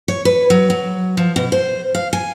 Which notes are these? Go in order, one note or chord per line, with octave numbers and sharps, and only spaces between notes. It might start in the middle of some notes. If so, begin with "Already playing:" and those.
C#5
B4
F#3
F#3
F3
B2
C5
F5
G#5